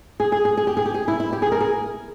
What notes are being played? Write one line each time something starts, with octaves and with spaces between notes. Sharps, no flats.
G#4
G#4
G#4
G#4
G4
G#4
G4
G#4
E4
E4
G4
G#4
A#4
G#4